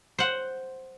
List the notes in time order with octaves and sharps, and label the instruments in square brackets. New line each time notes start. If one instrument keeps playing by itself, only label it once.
[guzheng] C5 F#5